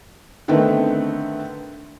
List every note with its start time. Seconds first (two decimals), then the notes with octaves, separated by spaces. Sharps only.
0.48 D3 D#3 A3 B3 C4 D#4